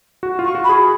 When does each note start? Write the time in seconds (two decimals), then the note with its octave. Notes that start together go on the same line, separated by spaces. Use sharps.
0.23 F#4
0.39 F4
0.44 C#6
0.55 F#4
0.64 B5
0.69 G#4